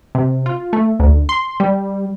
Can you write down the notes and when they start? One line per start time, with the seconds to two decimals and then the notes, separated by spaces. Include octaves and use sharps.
0.15 C3
0.46 F4
0.73 A3
1.00 D2
1.29 C6
1.60 G3